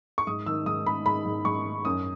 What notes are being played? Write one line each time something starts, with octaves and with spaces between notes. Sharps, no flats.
C#6
G#2 D#6
D#3 E6
G#2 D#6
G#2 B5
G#2 B5
G#2
G#2 C#6
D#3
F#2 D#6